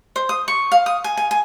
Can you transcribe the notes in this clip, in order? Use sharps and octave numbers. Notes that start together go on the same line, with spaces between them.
C5
D#6
C#6
F5
D#6
G#5
G#5
G#5